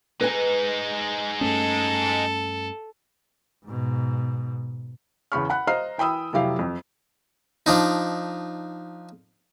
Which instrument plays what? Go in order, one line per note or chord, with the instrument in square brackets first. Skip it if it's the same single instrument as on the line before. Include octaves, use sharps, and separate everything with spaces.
[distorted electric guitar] G#3 D#4 [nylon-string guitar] B4 G#5
[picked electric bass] G2 A3 C#4 [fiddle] A4
[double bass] G#2 B2
[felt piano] E2 C#3 C#4 B5 C#6 F6
F#5 B5 F#6
C5 D#5 F5 A#5 F6 C7
E3 G5 B5 D#6 E6
F1 F#3 E4 G4 F5
F2
[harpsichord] F3 D4 D#4